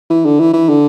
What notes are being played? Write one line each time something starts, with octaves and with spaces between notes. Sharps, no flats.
E3
D3
E3
E3
D3